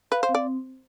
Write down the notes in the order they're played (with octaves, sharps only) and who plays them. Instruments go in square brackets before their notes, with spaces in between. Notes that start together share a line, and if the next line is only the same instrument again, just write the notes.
[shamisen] B4 [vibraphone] F5
[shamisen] C5
[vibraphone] C4
[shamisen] D5